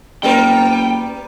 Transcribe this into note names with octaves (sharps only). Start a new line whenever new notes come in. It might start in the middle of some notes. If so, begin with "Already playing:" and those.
F#1 G3 B3 A#4 G5